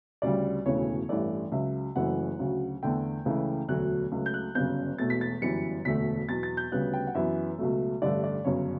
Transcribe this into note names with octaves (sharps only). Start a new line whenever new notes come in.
D2 C#3 G3 D5
E1 D2 C#3 E3 A3 C#5
A1 G2 E3 A3 D5
C#2 C#3 F#3 E5
F#1 F#2 E3 A3 F#5
D2 C#3 F#3
E2 D3 A3 G5
C#2 C#3 E3 A3
E1 D2 D3 F#3 A3 F#6
C#2 C#3 F#3 A3
G6
F#6
G1 F#2 C#3 G6
E1 E2 B2 A3 A6
B6
A6
G1 F#2 E3 G3 C#7
E1 D2 D3 A3 B6
E2 B2 F#3 A6
A6
G6
D2 C#3 G3 B3 F#6
G5
F#5
F#2 E3 B3 E5
C#2 B2 F#3 A3
A1 G2 D3 A3 D5
D5
G1 F#2 C#3 C#5